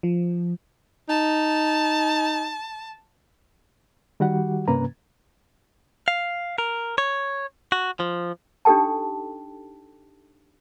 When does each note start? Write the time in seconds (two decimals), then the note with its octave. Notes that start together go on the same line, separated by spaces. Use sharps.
0.03 F3
1.09 D#4 A5
4.20 D#3 G3 F#4 G4 F#5
4.68 G2 C3 A#3 C#4 B4 A#5
6.08 F5
6.58 A#4
6.98 C#5
7.72 F#4
8.00 F3
8.65 D4 D#4 G4 A4 G5 A5